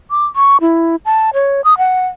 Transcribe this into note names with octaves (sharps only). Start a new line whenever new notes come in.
D6
C#6
E4
A5
C#5
D#6
F#5